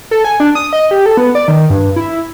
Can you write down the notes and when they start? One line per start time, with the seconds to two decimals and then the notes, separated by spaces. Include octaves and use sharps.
0.11 A4
0.25 G#5
0.40 D4
0.55 D#6
0.73 D#5
0.91 G4
1.06 A4
1.17 B3
1.35 D5
1.48 D#3
1.70 G2
1.96 E4